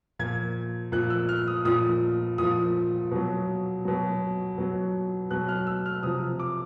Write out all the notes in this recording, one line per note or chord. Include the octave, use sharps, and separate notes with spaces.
A#2 F3 G#6
A#2 F3 F#6
E6
F6
D#6
A#2 F3 D#6
A#2 F3 D#6
B2 F#3
B2 F#3
B2 F#3
B2 F#3 F#6
F6
E6
F6
C3 F3 D#6
D6